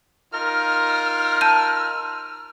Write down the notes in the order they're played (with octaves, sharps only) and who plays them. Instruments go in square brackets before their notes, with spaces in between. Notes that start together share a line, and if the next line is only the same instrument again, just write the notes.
[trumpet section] D#4 F4 A#4 [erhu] F6
[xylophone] A5 G6 D#7